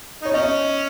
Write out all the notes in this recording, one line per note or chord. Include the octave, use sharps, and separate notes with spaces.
D#4 C#5
C#4 D#5